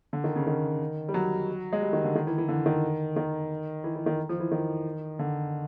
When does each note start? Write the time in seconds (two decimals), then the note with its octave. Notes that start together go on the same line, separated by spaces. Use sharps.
0.13 D3
0.24 D#3
0.36 C#3
0.47 D#3
1.09 G3
1.14 F#3
1.73 G#3
1.82 G3
1.93 D#3
2.04 D3
2.15 D#3
2.27 E3
2.38 E3
2.49 D3
2.66 D#3
3.16 D#3
3.84 E3
3.96 E3
4.06 D#3
4.29 F3
4.40 E3
4.51 D#3
5.19 D3